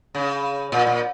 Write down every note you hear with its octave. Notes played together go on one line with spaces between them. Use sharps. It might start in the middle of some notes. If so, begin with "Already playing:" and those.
C#3
A#2
A#2